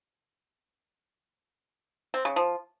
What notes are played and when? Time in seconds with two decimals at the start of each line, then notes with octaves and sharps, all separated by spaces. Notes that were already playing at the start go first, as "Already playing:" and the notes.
2.14 C4
2.25 C#3
2.36 F3